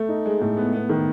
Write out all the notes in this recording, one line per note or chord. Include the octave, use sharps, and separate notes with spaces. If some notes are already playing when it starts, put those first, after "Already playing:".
Already playing: A3
D#4
G#3
A2
B3
B3
D#3